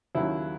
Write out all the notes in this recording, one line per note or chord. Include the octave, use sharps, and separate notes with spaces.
D#2 C#3 F#3 E4